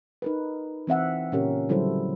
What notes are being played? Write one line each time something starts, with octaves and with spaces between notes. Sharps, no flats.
D#4 A#4 B4
E3 C4 E5 F#5
A#2 C#3 C#4 G4 A#4
D3 F#3 G3 E4 A4 C5